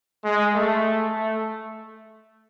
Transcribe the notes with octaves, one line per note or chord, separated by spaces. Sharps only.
G#3
A3
A3